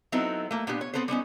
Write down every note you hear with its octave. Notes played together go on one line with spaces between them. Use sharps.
F#3 B3 C4 D#4 E4 A4
A3 A#3
A#2 B3 D4 G4
C#5
B3 C4 A4 B4 C5
G3 B3 C#4 D#4